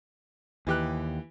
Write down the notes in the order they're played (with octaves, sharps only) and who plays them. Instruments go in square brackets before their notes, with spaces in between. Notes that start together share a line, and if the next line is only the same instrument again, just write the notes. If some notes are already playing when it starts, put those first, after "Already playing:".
[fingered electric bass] D#2 [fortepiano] E3 G4 F#6